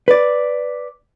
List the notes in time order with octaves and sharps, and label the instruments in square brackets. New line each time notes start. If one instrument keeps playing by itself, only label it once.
[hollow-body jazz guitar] B4 D5